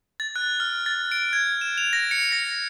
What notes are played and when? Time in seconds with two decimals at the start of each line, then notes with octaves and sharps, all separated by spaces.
0.20 A6
0.36 F#6
0.60 F6
0.86 A6
1.12 D7
1.33 G#6
1.61 E7
1.78 F7
1.93 A#6
2.11 C#7
2.32 A#6